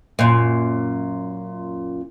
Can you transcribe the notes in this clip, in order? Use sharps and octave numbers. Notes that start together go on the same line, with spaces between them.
F#2 A#2